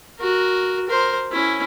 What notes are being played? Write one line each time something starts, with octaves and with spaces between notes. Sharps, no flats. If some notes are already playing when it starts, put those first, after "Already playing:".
F#4 A#4
A#4 C5
C#4 E4